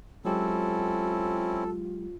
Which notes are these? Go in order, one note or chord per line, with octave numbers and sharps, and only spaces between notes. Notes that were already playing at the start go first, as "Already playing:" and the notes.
F#3 G#3 C4 C#4 E4 F4 G4 A4